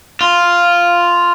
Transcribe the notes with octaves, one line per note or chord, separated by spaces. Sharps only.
F4